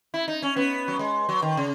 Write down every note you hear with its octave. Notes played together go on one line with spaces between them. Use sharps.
E4
D#4
C#4
B3
F#3
G#3
F#3
D#3
C#3